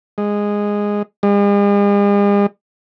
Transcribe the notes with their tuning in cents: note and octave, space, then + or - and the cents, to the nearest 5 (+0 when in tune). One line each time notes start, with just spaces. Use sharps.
G#3 -10
G#3 -45